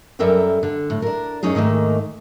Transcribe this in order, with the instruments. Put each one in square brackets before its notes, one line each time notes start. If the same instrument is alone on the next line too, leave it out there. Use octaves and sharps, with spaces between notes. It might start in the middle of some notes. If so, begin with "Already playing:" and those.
[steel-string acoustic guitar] F#2 G3 A4 A#4 E5 G5
D3
A2
D4 A#4
F#2 D#3 C#4 D#4 G#4
G#2 D#3 A3 A#3